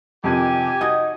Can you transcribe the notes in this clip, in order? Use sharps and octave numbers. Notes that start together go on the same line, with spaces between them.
F2 C3 D#3 G4 G#5
D#4 F#4 D#5 G#6